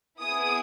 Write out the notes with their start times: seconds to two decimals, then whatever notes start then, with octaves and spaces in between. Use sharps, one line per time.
0.20 B3 E4 G#4 D#6